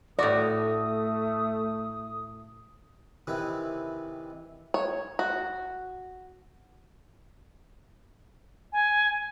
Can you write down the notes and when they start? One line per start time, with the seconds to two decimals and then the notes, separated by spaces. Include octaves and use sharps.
0.19 A2 A3 F#4 D5 D#6
3.27 C3 D#3 E3 E4 B4
4.74 C#5
5.19 F#4
8.73 G#5